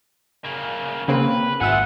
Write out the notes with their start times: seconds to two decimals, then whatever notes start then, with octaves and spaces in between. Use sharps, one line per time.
0.45 C#3 A#3
1.08 C#3 A#3 C4 B4
1.60 G#1 F4 G#4 E5 F#5 E7